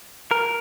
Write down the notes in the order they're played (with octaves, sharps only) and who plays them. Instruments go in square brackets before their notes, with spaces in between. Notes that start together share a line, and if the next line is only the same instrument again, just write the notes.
[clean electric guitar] A#4